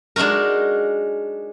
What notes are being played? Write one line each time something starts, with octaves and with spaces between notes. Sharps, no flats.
G#3 D4 D#4 F#4 A#4